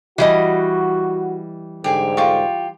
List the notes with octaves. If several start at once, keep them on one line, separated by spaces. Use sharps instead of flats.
E3 G3 F#4 D#5
G#2 D3 G4 G#4 G#5
F4 G4 C#6